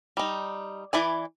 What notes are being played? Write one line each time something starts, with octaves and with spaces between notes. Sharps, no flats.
G3 D#4
E3 E4 D5 G#5